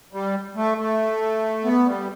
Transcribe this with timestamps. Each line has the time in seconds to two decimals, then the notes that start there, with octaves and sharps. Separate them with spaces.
0.13 G3
0.56 A3
0.78 A3
1.64 B3
1.86 G3